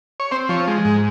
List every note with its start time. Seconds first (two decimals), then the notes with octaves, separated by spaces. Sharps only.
0.20 C#5
0.31 C4 C5
0.49 F3 C#5
0.67 G#3
0.85 G#2